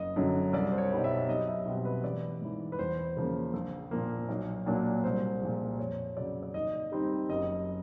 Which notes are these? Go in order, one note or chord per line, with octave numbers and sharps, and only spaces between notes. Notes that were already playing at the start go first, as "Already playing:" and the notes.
Already playing: F#1 D#5
F#2 D3 F#3
C2 D5
C5
C#5
B2 G3 B3 D#4
E5
B1 D#5
E5
B2 G3 C4
B4
A1 D5
G#2 E3
B4
E2 C5
C#3 F3 A#3
A#1
A#2 F3 A#3
B1
A#2 F#3 A#3 D4
C2 C5
A#2 F3 G#3
F2 C#5
C#3 F#3 D5
D5
D#2 D#5
D#3 G3 C4 D#4
F#1 D#5